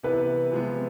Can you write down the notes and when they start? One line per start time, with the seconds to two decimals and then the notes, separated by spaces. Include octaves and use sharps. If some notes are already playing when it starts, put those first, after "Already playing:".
0.03 C3 E3 B3 B4
0.52 C3 F3 G#3 B3